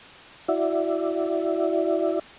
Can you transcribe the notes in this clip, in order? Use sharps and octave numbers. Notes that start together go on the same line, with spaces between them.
E4 F#4 D5 E5